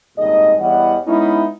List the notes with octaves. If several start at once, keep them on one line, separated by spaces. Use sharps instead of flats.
G#1 G2 A#2 D#3 G#4 D#5
E2 E3 G3 C#5 D#5 F#5
G#3 B3 C#4 D#4 E4